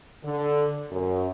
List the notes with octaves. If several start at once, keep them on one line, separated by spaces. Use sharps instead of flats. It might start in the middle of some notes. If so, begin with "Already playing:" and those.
D3
F#2